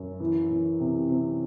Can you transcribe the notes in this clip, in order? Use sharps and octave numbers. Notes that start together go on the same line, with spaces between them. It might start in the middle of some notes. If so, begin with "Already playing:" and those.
Already playing: F#2
E3
E3
C3
C3